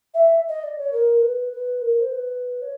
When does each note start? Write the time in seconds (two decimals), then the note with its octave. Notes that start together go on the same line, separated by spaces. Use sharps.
0.14 E5
0.49 D#5
0.63 D5
0.77 C#5
0.92 A#4
1.22 B4
1.52 B4
1.81 A#4
2.00 C5
2.11 B4
2.62 C#5